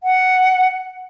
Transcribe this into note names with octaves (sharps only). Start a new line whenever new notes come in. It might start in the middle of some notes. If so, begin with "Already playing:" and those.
F#5